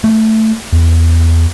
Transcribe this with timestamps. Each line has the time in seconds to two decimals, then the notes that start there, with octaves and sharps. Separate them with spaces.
0.04 A3
0.73 E2